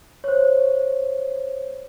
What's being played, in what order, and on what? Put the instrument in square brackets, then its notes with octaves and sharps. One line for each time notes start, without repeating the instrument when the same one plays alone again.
[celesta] C5 C#5